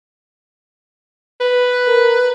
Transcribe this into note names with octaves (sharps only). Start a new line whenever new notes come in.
B4
A#4